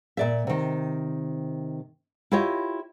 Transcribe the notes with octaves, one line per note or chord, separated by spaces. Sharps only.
A#2 D5 E5
C3 D#3
E4 F4 G4 C#5 D#5